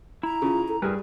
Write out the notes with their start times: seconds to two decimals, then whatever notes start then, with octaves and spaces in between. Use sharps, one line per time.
0.23 E4 A#5
0.42 C#3 F4
0.68 A4
0.82 G2 G3 E4 G#4 A#4 B4